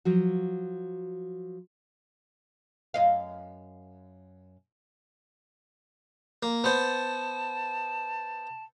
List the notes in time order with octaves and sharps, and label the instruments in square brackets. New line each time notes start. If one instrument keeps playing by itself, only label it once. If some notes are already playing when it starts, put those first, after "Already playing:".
[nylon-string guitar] F3 F#3 F#4
[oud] F#2 D#5 F5
[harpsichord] A#3
[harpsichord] B3 C5 [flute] A5